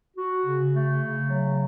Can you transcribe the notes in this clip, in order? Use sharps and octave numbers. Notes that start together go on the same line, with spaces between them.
F#4
C#3
A3
C#3
F#3